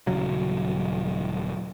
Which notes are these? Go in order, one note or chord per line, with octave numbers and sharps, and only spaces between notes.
D#1 C#3 F#3